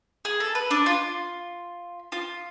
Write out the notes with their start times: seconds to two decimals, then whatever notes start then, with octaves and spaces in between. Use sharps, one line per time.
0.25 G#4
0.40 A4
0.55 B4
0.71 D4
0.86 F4
2.12 F4